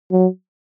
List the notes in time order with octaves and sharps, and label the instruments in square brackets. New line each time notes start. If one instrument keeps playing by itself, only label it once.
[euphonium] F#3